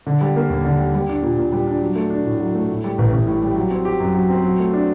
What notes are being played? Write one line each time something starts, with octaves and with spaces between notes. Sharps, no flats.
D3
G3
A#3
D#2
D3
G3
G3
D4
A#2
A#2
G3
D4
F#3
A3
D4
A2
F#3
A3
A2
G3
A1
A1
A2
G3
F#3
C4
G4
F#2
F#3
C4
F#3
A3
D4